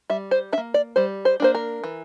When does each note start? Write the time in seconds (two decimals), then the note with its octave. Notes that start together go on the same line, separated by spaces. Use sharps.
0.10 G3 E5
0.31 C5
0.53 D4 E5
0.58 A#3
0.74 D5
0.96 G3 C5
1.25 C5
1.40 A#3 D4 C5
1.55 A#4
1.84 E3